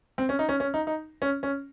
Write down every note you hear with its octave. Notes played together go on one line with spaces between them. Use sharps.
C4
C#4
D#4
C#4
C#4
D#4
D#4
C#4
C#4